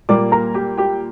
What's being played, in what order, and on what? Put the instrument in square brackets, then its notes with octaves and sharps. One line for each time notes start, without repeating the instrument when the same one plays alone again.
[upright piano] A#2 G3 A#3 D5 D6
A#4 A#5
G4 G5
G4 G5